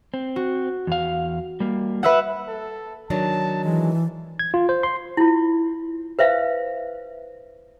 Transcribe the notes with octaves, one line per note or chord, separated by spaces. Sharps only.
C4
F#4
E2 F5
G3 A#3
B4 E5 F#5
A4
D#3 F#3 D4 A5
E3 G#3
G#6
F4
C5
C6
E4 F4
B4 C5 E5 F5